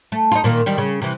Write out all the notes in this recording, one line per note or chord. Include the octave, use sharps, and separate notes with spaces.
A3
D#4 F4
A#2 D#3 A#3
D#3 G3
C#3
C3 E3